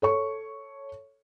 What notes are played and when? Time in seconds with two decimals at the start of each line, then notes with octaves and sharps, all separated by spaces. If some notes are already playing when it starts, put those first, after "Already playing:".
0.02 A4 C#5 C#6